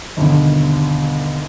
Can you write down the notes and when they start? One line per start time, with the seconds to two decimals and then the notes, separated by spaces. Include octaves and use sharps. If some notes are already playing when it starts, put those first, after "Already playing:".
0.17 G1 D#2 B2